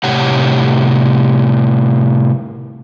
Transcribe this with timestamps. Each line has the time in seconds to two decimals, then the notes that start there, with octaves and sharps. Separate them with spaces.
0.04 A2 C3 G4 C#5 F#5